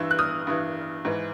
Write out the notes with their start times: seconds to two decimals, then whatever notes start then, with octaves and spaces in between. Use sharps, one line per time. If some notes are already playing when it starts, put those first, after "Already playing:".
Already playing: G2 E3 E6
0.11 F#6
0.19 D#6 F6
0.47 G2 E3
1.05 G#2 E3